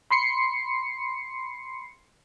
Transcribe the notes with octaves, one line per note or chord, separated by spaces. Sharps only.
B5 C6 C7 C#7